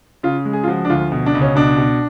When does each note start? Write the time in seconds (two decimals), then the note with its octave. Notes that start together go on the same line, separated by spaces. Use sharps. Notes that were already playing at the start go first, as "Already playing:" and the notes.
0.23 C#3 F4
0.45 G#3
0.53 G#4
0.64 F4
0.68 F3 F#4
0.85 D4
0.90 D2 F4
1.12 B2
1.26 D4
1.35 C#2
1.42 C#4
1.56 B2 D4
1.78 B2